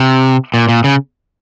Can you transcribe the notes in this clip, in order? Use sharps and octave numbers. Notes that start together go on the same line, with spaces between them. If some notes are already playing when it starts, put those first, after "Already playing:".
Already playing: C3
A#2
A#2
C#3